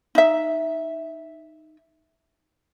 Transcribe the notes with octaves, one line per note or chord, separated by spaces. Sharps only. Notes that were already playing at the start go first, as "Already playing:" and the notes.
D#4 E5